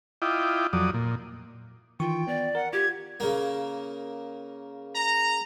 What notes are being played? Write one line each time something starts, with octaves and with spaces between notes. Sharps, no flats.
E4 F4 D#5 G5 D6
F2 F#3 D5 D#6
A#2
D#3 E3 F4 G5 C#6
B3 D5
A#4 F#5
F4 G4 G#6
C#3 A#3
A#5